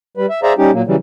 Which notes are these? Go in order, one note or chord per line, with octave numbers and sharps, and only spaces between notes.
G3 B4
E5
G#4 C5 D5 E5 F5 A#5
G3 C#4 D#4 G4
A#2 F#3 A#3
C#3 E3 F#3 G3